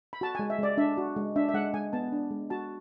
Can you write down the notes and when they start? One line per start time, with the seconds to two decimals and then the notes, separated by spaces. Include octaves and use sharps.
0.13 B5
0.21 F#4 A5
0.35 G#3 G#5
0.50 E5
0.58 G#3 D5
0.77 D4 E5
0.98 F#4
1.16 G#3
1.36 D4 E5
1.49 E5
1.54 G#3 F#5
1.74 G#3 G#5
1.93 B3 A5
2.12 D4
2.31 G#3
2.50 F#4 A5